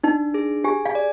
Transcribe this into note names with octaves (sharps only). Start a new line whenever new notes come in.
D4 D#4
G#4
G4 G#5
F5
D5